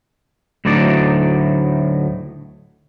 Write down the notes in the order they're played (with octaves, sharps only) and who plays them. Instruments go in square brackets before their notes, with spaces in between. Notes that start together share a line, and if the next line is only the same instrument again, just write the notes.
[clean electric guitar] D2 A2 F#3 D#4 D5